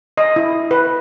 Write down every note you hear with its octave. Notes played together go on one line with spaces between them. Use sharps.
D#5
E4
B4